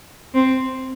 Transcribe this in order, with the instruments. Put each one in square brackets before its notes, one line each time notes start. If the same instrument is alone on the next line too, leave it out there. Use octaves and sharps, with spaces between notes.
[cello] C4